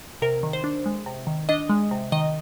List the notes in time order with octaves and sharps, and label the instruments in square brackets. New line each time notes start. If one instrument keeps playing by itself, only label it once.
[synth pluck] C3 A#4
D#3
C5
D4
G#3
C3
D#3
D4 D#5
G#3
C3
D#3 D#5